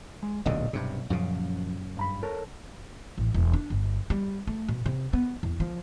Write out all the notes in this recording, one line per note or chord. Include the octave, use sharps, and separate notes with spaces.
G#3
D1 B1 A#2 D3 D5 D#5
B1 G2 C3
F#2 A#2 C#3 F3
G2 A#5 B5
A4 A#4 C#5
A1
E1
D4
G1
G3
A3
B2
C3
B3
E2
F3